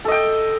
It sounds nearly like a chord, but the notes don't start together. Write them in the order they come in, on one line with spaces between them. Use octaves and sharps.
A4 D#5 G5